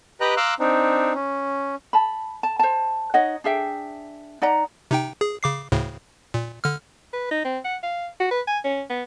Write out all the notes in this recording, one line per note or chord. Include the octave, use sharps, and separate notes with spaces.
G4 B4 D#5 G5 A#5 F#6
F5 A#5 C6 D6 E6 F#6
C4 D4 D#4
C#4
A5 B5
A5
C5 A5
D#4 C#5 D#5 F#5
D4 G#4 E5 G5
D#4 D5 F#5 A#5
C3 D#4 G5
G#4
C#3 D6 C7
D2 A2 C#3
A#2
D3 F6
B4
D#4
C4
F#5
F5
F#4
B4
G#5
C#4
B3